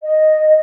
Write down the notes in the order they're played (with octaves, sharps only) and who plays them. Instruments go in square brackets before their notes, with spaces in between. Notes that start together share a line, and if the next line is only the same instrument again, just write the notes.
[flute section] D#5